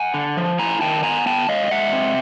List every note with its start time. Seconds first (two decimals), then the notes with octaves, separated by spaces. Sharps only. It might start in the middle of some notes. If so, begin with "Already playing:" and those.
Already playing: F#5 G#5
0.14 D3
0.37 F3
0.59 E4 G#5 A#5
0.81 D#3 G5 A5
1.03 B3 G#5 A#5
1.26 B3 G5 A5
1.49 G#3 D#5 F5
1.71 G#3 E5 F#5
1.93 C4